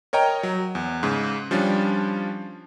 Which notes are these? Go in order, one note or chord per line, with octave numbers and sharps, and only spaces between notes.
A#4 C#5 D#5 G5 A#5
F#3
E2
G#2 C#3
F3 G3 C#4 D4 F4